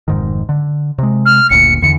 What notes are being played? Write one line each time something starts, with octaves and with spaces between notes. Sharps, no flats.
F1 G#2 D#3
D3
C3 G#3
F6
F#1 D2 A#2 C#7
E2 D3 E3 C#7